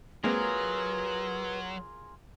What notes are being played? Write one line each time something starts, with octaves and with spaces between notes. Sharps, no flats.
F#3 G#3 A#3 C4 F4 G#4 A#4 B4